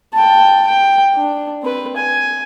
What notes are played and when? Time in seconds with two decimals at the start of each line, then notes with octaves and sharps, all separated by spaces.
0.14 G5 A5
0.67 G5
1.15 D4
1.62 C4 B4
1.97 G#5